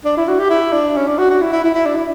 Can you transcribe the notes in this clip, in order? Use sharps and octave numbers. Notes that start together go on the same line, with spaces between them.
D4
E4
F#4
G4
E4
D4
C#4
D4
F#4
F#4
E4
E4
E4
E4
D4
E4